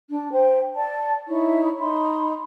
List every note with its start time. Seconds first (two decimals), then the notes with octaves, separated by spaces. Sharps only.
0.10 D4
0.30 C5 G5
0.74 D5 A5
1.28 D#4 E4 C#5 C#6
1.78 D#4 B5 C6